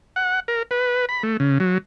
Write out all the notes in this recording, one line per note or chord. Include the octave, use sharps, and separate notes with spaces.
F#5
A#4
B4
B5
A3
C#3
F#3